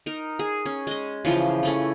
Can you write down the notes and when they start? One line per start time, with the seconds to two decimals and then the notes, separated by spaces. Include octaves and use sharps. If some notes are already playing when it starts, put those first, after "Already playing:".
0.06 D#4 A#4
0.39 G#4
0.66 C#4
0.87 G#3 D#5
1.25 C#3 E3 F3 C5
1.63 E3 A3 C#4